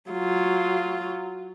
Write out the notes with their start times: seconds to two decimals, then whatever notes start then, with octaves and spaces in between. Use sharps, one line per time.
0.11 F#3 F4